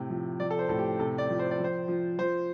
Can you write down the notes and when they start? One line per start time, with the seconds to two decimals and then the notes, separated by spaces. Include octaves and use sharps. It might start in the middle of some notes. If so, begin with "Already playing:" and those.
Already playing: A2 C3
0.10 F3
0.40 F3 D5
0.51 A4
0.59 C5
0.69 A2 A4
0.79 G4
0.99 C3 A4
1.18 D5
1.29 F3
1.39 C5
1.51 D5
1.59 F3 C5
1.88 F3
2.19 F3 C5